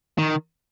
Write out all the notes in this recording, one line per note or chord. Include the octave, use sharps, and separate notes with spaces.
D#3